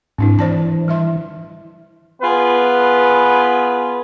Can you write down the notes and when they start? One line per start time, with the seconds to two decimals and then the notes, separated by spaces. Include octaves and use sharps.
0.18 G#2 C4 D4 E4
0.39 E3 C5 D5 A5
0.88 G3 E5 C6
2.22 B3 F4 G#4 B4